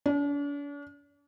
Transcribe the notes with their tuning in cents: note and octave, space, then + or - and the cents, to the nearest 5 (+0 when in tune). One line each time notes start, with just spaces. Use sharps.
D4 -45